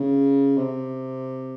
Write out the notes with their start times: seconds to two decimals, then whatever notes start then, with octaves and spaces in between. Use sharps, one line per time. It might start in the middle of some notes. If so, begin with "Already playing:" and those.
Already playing: C#3
0.57 C3